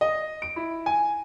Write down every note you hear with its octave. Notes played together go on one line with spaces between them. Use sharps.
D#5
D7
E4
G#5